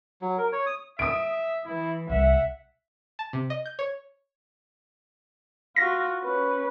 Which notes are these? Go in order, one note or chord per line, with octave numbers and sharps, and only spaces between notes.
F#3
A#4
C#5
D#6
E5 D#6 D7
E3 E4
C2 E5 F#5
A5
C3
D#5
G6
C#5
F4 F#4 A#6
C#4 B4